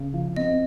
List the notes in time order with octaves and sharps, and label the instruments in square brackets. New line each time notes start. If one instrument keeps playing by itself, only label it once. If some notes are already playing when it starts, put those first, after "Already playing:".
Already playing: [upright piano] C#3
F3
[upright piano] C4 [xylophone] D#5